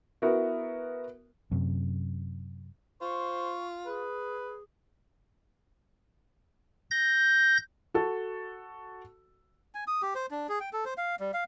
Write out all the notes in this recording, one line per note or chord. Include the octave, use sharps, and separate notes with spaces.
B3 E4 F#4 A#4
F#2 C3
F4 C5 C#6
G#4 B4
G6 A#6
F#4 A4
G#5
D#6
G4
C5
D4
G#4
G5
A4
C5
F5
G3
F5